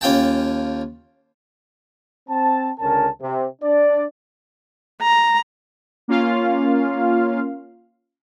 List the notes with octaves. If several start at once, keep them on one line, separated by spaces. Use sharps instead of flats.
D#2 C#4 F4 G5 A5
C4 A5
C#2 D3 C#4 A#4 A5
C3
D4 D5
A#5
A#3 C#4 F4 F5